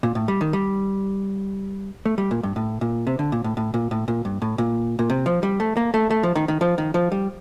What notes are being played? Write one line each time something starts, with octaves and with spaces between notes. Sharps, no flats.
A#2
A2
G3
D#3
G3
A3
G3
A#2
G2
A2
A#2
C3
D3
A#2
A2
A2
A#2
A2
A#2
G2
A2
A#2
A#2
C3
F3
G3
A3
A#3
A3
A3
F3
D#3
D#3
F3
D#3
F3
G3